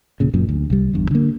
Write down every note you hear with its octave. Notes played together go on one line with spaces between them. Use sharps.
E1 A#2 C#3
F#1 F#2 A#2
D2
C2 G3
G1 E2 G2
D3 A#3